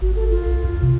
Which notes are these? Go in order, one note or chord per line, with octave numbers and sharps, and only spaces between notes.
G#1 F#4
A4
F4
B1
E2
C3